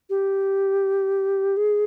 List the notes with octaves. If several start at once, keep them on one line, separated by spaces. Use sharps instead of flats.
G4
G#4